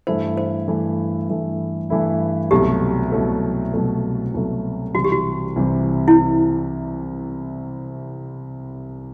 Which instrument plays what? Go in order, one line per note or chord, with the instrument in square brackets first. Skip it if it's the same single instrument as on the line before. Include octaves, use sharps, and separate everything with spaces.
[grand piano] G2 E3 A3 E4 [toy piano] C5
[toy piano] C5
[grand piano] G2 E3 A3 E4
G2 E3 A3 E4
G2 E3 A3 E4
[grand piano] C2 B2 F#3 A3 [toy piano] G4
[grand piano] C2 B2 F#3 A3
C2 B2 F#3 A3
C2 B2 F#3 A3
[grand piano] C2 C3 E3 G3 [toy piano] F#4
[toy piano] G4
F#4
[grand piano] C2 C3 E3 G3
[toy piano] E4